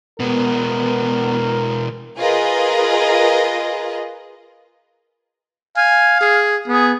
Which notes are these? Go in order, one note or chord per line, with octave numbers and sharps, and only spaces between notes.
B2 G#3 B3 A#4
F4 G#4 A#4 B4 D#5
F5 G#5
G#4
B3 G#4